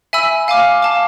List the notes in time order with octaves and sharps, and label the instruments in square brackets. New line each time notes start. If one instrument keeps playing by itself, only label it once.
[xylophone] E5 G#5 B5 E6
F5 G#5 D6 F6
F5 A5 D6